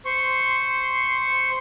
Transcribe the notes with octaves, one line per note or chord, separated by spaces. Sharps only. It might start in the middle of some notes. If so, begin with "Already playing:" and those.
C5 C6 C#6